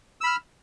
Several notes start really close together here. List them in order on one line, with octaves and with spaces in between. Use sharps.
E6 B5 F6